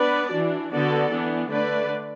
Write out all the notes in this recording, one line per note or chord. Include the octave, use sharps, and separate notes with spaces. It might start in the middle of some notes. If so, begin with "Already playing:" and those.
Already playing: B3 D4 B4 D5
E3 D4 F#4
D3 B3 F#4 A4 D5
E3 B3 D4
D3 A3 D4 B4 D5